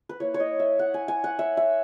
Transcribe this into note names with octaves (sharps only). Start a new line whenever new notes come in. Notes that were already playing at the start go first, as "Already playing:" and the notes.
B4
A#3 E4 C#5
C#5
D#5
E5
F#5
G#5
G#5
F#5
E5
E5